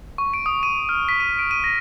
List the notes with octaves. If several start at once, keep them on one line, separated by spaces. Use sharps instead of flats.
C#6
D7
D#6
D#7
F6
B6
D#7
D7
D#7
A#6